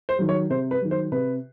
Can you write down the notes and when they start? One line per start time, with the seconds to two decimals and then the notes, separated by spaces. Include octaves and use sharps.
0.09 C5
0.19 D#3 F#3
0.29 C#5
0.50 C3 C5
0.71 B4
0.81 D#3 F#3
0.91 C5
1.12 C3 B4